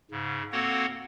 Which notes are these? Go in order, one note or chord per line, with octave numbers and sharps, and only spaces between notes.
G#2 C#3
A#3 C4 F#4 A4 C#5 F#5